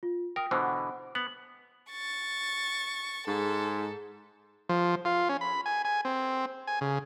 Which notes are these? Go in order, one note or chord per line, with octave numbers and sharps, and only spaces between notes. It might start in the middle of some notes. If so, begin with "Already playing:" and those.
F4
A#4 G5 D#6
B2 D3 E3 C5 F#5
B3 F#7
C#6 A6
G#2 A4
F3
F4
C#4
B5
G#5
G#5
C4
G#5
C#3